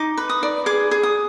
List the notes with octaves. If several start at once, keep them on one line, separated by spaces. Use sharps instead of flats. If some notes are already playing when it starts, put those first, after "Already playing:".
Already playing: D#4 D6
B4
D#6
D5
G#4 D6
G#4
D#6